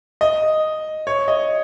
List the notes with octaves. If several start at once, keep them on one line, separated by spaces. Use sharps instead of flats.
D#5
C#5
D#5